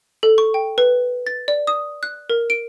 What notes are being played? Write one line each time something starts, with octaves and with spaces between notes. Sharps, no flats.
A4
C#6
G5
B4
A6
D5
D#6
F#6
A#4
D7